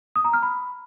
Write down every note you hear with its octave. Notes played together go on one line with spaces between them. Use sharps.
D#6
A#5
F6
B5